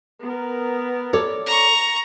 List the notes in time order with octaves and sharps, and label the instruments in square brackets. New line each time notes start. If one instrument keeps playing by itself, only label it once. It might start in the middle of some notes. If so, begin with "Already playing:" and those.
[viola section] B3 A#4
[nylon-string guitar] A4 C#5 D5
[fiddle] A#5 C#6